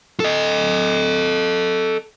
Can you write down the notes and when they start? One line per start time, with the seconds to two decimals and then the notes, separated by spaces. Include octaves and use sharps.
0.20 A4 D#5